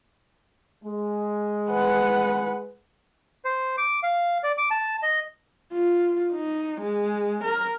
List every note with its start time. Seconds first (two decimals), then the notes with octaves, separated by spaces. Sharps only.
0.84 G#3
1.70 B4 F#5
3.45 C5
3.78 D6
4.03 F5
4.43 D5
4.58 D6
4.71 A5
5.03 D#5
5.73 F4
6.33 D#4
6.82 G#3
7.44 A#4